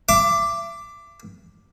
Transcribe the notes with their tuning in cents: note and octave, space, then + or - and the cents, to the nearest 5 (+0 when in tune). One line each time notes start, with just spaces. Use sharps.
E5 +35 D6 +0